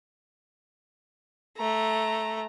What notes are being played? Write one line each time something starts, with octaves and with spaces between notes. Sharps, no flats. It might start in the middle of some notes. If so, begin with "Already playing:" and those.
A3 A#5